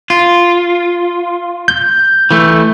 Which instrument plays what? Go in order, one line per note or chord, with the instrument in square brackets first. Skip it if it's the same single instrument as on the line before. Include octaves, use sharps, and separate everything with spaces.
[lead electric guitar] F4
[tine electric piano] G6
[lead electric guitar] E3 A3